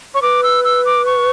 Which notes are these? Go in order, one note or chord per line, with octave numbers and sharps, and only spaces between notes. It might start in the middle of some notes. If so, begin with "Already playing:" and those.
C#5 C#6
B4 D6
E6
E6
D6
C#6